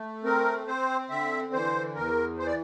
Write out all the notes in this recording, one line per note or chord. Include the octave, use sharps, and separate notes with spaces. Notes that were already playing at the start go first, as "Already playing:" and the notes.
Already playing: A3
C4 A#4
C4 C5
D3 E5
E3 C5
E2 A#4
E3 C5
D5